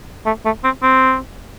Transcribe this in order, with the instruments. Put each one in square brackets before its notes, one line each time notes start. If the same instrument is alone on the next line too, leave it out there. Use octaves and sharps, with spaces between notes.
[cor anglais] A3
A3
C4
C4